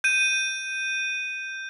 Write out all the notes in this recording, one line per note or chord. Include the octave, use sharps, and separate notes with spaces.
G6 D#7